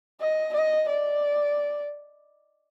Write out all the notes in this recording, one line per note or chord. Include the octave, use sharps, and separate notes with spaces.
D#5
D#5
D5